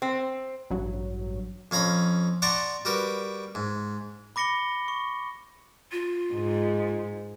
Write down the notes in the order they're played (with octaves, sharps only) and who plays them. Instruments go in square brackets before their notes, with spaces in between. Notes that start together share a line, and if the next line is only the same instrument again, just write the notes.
[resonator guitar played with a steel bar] C4
[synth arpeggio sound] A1 G2 F#3
[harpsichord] F2 C#4 F5 A#5 B5
D5 F#5 A5 A#5 C6 C#6
G3 F#4 A#4 B4
G#2
[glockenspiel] B5 D6 A#6 C#7 G7
C#6
[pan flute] F4
[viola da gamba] G#2